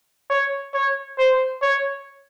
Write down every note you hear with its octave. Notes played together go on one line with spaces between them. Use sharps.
C#5
C#5
C5
C#5